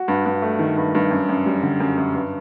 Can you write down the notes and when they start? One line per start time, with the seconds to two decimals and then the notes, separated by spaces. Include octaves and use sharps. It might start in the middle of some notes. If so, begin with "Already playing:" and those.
Already playing: F#4
0.08 G2
0.26 G2
0.42 A3
0.59 D#3
0.77 G2
0.95 G2
1.11 F#2
1.29 F#2
1.46 G3
1.63 D3
1.80 F#2
1.98 F#2
2.15 G2